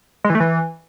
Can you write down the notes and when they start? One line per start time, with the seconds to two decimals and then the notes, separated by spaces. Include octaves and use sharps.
0.24 G#3
0.30 E3
0.35 A3
0.40 E3